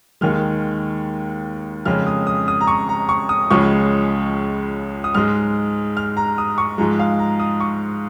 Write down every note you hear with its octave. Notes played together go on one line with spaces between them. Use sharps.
D#2 D#3 G#3 F6
F2 C#3 G#3 F6
D#6
D#6
D#6
A#5
C#6
A#5
C#6
D#6
C#2 C#3 F3 G#3 C#6
D#6
G#2 G#3 F6
F6
A#5
D#6
C#6
G#2 F3 G#3 A#5
F5
A#5
D#6
C#6